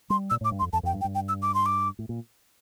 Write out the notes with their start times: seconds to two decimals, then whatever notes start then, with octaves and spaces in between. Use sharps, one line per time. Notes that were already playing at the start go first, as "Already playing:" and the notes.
0.10 G3 C6
0.30 A#2 E6
0.41 A2 D6
0.51 G2
0.59 C6
0.62 F2
0.73 F2 A5
0.83 F2 G5
0.93 G2
1.01 G5
1.04 G2
1.15 G5
1.29 E6
1.42 D6
1.55 C6
1.66 D6
1.99 A2
2.09 A#2